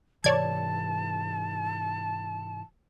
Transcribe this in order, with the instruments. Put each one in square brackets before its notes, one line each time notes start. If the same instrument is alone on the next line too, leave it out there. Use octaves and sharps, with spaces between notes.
[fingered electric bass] G#2 C3 E3 [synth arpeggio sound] C#5 D5 G#6 [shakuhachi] A5